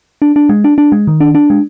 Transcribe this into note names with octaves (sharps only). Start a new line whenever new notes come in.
D4
D4
G#3
D4
D4
G#3
D#3
D4
D4
G#3